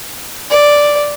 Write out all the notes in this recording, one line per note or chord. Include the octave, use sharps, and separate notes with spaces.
D5